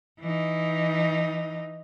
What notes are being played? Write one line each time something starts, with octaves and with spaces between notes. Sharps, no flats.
E3 D#4